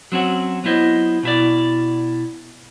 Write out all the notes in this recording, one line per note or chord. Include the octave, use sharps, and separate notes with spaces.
F#3 C4 C#4 F#4
F#3 B3 E4 C5 D#5
B2 E4 D5